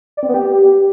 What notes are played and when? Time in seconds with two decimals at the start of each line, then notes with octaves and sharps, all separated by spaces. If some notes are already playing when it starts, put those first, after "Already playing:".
0.17 D5
0.23 C4
0.28 B3
0.34 G4